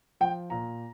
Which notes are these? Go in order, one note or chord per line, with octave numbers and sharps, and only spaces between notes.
F3 G5
A#2 A#5